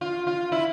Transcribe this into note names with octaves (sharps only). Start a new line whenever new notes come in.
F4
F4
E4